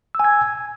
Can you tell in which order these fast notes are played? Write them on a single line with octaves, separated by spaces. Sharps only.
E6 G#5 G#6